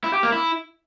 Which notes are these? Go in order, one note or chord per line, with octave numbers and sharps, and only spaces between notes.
E4
G4
A#3
E4